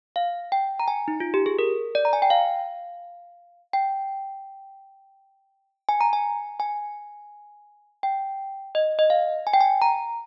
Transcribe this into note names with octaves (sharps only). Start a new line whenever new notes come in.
F5
G5
A#5
G#5
D#4
F4
G4
G#4
A#4
D5
A#5
G#5
G5
F5
G5
G#5
A#5
G#5
G#5
G5
D#5
D#5
F5
G#5
G5
G#5
A#5